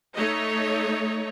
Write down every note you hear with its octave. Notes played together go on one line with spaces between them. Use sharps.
A3 D#4 C#5 D#5